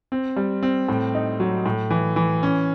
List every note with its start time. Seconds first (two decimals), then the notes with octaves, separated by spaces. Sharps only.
0.12 C4
0.36 G3
0.63 C4
0.89 A2
1.15 D#4
1.40 F#3
1.66 A2
1.90 E3
2.16 E3
2.43 C#4